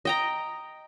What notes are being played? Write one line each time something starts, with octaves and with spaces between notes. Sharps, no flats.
D#5 G5 A#5